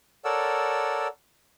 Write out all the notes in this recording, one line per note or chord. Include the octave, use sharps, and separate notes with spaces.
A4 A#4 C#5 D5 F#5 E6